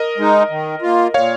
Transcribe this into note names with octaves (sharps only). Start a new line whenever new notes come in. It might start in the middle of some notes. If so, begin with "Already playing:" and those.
Already playing: A#4 D#5
G#3 D#4
D#3
A#3 F4
A#2 C#5 F5